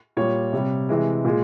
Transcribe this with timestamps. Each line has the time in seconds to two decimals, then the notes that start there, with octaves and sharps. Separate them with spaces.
0.17 A#2 G3 C#5
0.53 C3 G3
0.89 C3 E3 G#3
1.25 A#2 G#3